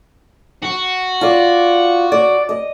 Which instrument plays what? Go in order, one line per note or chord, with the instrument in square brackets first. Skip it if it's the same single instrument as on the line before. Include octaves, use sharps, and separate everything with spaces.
[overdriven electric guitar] F#4
[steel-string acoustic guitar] F4 D5
D5
D#5